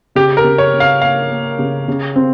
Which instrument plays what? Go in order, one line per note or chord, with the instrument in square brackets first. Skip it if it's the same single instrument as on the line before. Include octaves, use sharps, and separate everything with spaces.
[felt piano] C#3 [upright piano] G4
[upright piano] A#4
[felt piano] C#3
[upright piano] C#5
[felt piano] C#3
[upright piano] F5
[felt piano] A#3 [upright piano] F5
[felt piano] A#3
C#3
C#3
C4